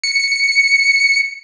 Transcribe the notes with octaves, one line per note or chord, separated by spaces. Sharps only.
C#7